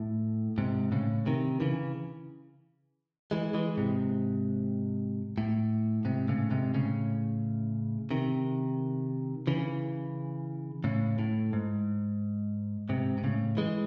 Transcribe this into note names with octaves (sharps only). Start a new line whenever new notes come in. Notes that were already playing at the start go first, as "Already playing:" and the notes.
Already playing: A2
G#2 C3
A2 C#3
C3 D#3
C#3 E3
E3 G#3
E3 G#3
G#2 C3
A2
G#2 C3
A2 C#3
G#2 C3
A2 C#3
C3 D#3
C#3 E3
A2 C#3
A2
G#2
G#2 C3
C3
A2 C#3
E3 G#3